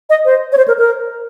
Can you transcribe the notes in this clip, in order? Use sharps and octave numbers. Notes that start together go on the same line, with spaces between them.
D#5
C5
C#5
C5
A#4
A#4